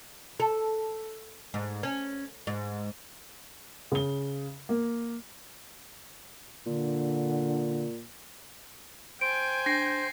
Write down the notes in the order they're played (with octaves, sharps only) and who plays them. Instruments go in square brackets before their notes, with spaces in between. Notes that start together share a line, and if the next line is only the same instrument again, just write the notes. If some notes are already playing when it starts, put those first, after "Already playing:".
[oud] A4
G#2
C#4
G#2
[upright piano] C#3 G7
A#3
[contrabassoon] A#2 [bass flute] D3
[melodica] C5 [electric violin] G5 G#5 [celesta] D7
[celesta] D4 [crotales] A#6 C7